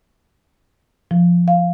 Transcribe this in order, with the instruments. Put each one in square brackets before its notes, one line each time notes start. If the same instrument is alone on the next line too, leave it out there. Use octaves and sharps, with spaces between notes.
[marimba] F3
F5